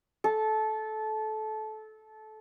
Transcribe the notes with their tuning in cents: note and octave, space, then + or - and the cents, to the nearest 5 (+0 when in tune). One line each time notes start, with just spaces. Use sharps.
A4 -20